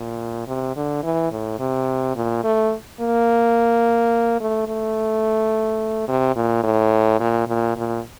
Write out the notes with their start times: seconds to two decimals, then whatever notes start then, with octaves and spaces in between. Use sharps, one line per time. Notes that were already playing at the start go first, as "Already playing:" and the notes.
Already playing: A#2
0.47 C3
0.76 D3
1.03 E3
1.32 A2
1.59 C3
2.16 A#2
2.44 A3
3.00 A#3
4.40 A3
4.68 A3
6.08 C3
6.36 A#2
6.64 A2
7.20 A#2
7.48 A#2
7.77 A#2